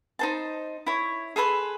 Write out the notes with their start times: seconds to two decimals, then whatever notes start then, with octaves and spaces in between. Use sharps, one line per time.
0.19 D#4 C5 A5
0.86 E4 C#5
1.36 G#4 A4 B4 C6